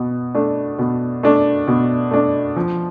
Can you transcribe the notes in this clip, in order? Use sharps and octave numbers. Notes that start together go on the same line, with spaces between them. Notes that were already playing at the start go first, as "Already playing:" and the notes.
Already playing: B2
A3 D4
B2
A3 D4
B2
A3 D4
F3